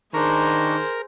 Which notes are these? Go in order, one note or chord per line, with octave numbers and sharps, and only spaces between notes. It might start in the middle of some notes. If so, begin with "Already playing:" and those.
D#3 D4 G#4 A#4 C5 A#5 C#6